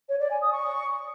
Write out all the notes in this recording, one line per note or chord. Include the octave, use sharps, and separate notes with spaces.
C#5
D5
G#5
D#6
C#6